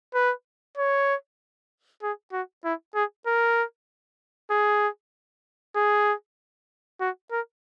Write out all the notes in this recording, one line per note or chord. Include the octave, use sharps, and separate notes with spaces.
B4
C#5
G#4
F#4
E4
G#4
A#4
G#4
G#4
F#4
A#4